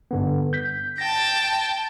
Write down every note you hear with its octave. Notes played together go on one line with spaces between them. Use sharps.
G2 D3 B3
G6 B6
G5 A5 A#6